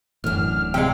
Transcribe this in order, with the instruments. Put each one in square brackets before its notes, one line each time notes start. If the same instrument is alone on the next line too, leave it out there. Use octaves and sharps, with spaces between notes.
[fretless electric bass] D1 A2 E3 [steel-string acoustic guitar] F#2 D4 [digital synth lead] F6
[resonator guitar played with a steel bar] C3 G#3 [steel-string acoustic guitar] F5 [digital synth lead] G5